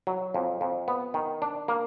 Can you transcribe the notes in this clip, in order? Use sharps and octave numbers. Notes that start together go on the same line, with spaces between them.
F#3
F2
F2
B3
D#3
D4
A#3